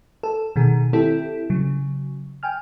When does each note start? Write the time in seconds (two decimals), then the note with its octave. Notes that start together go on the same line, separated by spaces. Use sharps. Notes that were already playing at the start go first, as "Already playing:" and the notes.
0.23 A4
0.56 B2 D#3 G#4
0.93 C4 E4 G4 A4
1.50 C#3 F#3
2.43 G5 G#5 F6